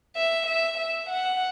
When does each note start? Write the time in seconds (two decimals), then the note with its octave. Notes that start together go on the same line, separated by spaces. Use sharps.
0.17 E5
0.46 E5
0.77 E5
1.09 F#5